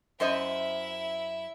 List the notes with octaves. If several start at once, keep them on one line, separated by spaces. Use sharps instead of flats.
F#2 E4 C5 D#5 E5